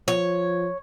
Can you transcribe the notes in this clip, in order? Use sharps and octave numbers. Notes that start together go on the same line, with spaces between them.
F3 C#5